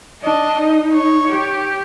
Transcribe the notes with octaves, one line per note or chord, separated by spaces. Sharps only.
D4 D#5
D#4
C#5
G4